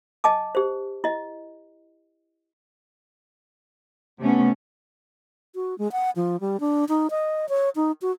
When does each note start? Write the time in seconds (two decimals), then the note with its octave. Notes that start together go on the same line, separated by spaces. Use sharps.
0.24 D#5 G#5 A5 D6
0.55 G4 C5
1.04 E4 D#5
4.20 C3 A3 B3 C#4
5.55 F#4
5.78 G#3
5.92 F#5
6.16 F3
6.40 G3
6.60 D4
6.89 D#4
7.10 D#5
7.49 C#5
7.76 D#4
8.02 F#4